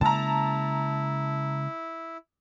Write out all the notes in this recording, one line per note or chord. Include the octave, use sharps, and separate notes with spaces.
C#3 G#3 A#3 E4 A5 A#5